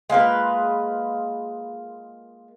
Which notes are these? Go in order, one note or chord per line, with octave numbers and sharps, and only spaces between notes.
G#3 A#3 F4 B4